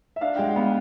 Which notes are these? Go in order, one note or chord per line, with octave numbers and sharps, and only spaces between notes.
E5
D4 F5
G#3 G5
F#5
B3